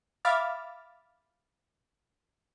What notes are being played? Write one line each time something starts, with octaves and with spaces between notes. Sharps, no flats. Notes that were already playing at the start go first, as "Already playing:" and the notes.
E5 F5 B5 D6 F6 A6